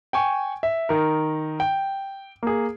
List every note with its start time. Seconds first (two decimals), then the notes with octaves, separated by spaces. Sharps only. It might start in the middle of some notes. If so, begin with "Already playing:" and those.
0.13 G5 G#5 C#6
0.63 E5
0.89 D#3 A#4
1.60 G5
2.43 A#3 G#4